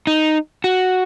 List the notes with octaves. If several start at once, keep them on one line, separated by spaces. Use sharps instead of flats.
D#4
F#4